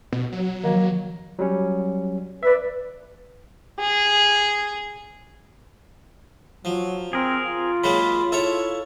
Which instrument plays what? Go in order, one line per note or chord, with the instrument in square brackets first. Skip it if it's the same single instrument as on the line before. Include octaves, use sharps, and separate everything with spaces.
[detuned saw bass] B2
F#3
[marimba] D#3 F3 [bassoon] A#3
[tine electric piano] F#3 G3 C#4
[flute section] B4 [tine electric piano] D5 E5
[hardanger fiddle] G#4
[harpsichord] F3 [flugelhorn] F#3
[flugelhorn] C4 [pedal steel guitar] G#4 A#4
[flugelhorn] F4
[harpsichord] F#3 G#3 A#3 [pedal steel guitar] B5
[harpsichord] E4 C#5 [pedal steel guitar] A4